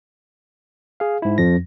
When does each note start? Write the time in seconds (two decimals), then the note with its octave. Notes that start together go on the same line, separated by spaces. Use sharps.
1.00 G#4 F5
1.22 G#2 E4
1.38 F2 F3 A#6